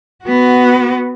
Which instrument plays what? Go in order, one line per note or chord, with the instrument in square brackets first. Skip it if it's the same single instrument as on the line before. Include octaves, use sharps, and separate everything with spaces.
[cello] B3 F#4